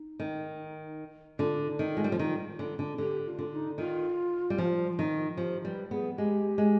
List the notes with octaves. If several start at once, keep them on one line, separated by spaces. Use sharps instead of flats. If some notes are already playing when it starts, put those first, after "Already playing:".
Already playing: D#4
D#3
D3 F4
D#4
D#3
G#3 F4
G3
F3
D#3
D3
D3
D3 G4
F4
D3
D#4
D#3 F4
G3
F3
D#3
F3 G4
G3 B4
B3 G#4
G#3 G4
G#3